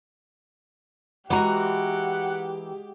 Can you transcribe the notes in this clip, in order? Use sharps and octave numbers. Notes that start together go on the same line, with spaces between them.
E3 G#3 F#4 G4 F#5 A#5